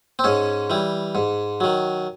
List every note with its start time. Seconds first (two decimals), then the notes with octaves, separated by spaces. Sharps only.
0.19 C4
0.24 G#2 C#4
0.70 E3 G3
1.15 G#2
1.61 D#3 F#3